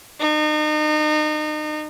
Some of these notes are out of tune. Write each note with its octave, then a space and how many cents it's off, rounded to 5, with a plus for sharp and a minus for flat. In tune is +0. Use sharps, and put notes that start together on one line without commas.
D#4 -35